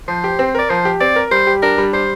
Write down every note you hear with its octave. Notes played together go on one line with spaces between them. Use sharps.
F3 C5
G4
C4
A#4 D5
F3 C5
G4
C4 D5
A#4
G3 C5
G4
D4 A#4
G3
G3 C5